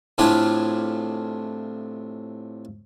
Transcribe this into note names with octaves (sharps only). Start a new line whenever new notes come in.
A2 C3 C4 D4 F4 G#4